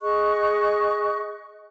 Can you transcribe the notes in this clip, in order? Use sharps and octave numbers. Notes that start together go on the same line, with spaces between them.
G#4 D#5 C#6 F#6